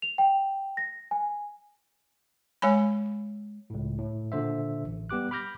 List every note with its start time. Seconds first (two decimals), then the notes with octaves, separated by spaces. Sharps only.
0.02 F7
0.18 G5
0.77 A#6
1.11 G#5
2.62 G#3 C#5 G#5 B5
3.70 C#2 A2
3.99 A2
4.32 A#2 D3 C5 E5
4.84 A1
5.10 G3 B3 G4 D6 F#6
5.31 B5 D6 F6 G6 A#6